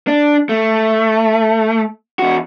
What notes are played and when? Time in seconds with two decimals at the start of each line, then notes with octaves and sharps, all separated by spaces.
0.08 D4
0.49 A3
2.19 E2 F#4